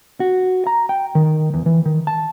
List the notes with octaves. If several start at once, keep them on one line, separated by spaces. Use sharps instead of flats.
F#4
A#5
G5
D#3
E2
E3
D#3
A5